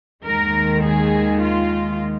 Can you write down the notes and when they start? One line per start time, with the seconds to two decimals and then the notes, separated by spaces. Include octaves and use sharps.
0.24 D#2 D#3 G#3 A#4
0.84 G#4
1.42 F4